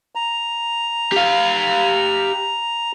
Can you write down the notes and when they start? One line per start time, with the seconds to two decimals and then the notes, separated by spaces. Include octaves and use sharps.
0.15 A#5
1.12 G4 F5